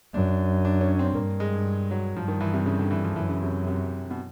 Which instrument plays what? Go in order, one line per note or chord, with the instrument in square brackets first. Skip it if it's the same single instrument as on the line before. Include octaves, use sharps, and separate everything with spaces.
[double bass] F#2 [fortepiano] D4
[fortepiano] D4
C#4
C4
[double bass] G2 [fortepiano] A#3
[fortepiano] G#3
F#3
[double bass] G2 [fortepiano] F3
[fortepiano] D#3
E3
C3
C#3
D3
E3
F3
[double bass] F#2 [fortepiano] E3
[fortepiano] C#3
C3
C3
B2